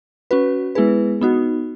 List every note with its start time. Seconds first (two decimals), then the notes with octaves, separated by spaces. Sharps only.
0.31 C#4 F#4 B4
0.75 G#3 B3 E4 G#4 B4
1.21 B3 D#4 F#4